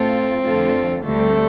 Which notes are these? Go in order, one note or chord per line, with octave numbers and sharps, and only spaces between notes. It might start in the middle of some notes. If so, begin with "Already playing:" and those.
Already playing: A2 A3 C4 F4 A4
F2 D3 A3 F4 A4
D2 D3 G3 A3 C4